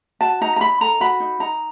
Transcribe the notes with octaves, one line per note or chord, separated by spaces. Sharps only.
F#4 A5
D#4 A#5
A#5
D#4 B5
A4 A#5
F#4 B5
D#4
D#4 A#5